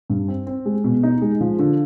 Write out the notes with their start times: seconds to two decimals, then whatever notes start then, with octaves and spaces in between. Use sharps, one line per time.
0.10 G2
0.28 C4
0.47 C4
0.66 G#3
0.84 B2
1.03 D#4
1.22 G#3
1.41 F3
1.59 D3